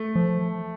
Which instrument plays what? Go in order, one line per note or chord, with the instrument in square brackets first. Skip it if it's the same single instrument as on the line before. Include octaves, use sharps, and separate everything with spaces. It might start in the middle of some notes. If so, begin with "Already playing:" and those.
Already playing: [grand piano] A3
[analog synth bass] F3